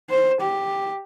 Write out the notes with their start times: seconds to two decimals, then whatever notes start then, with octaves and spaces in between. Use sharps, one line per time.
0.10 C5
0.41 G4